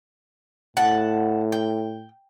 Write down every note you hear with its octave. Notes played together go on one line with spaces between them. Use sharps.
A2 F#5 A5
G5